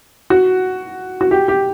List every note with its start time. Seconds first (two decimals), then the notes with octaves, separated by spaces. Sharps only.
0.30 F#4
1.21 F#4
1.31 G4
1.48 G4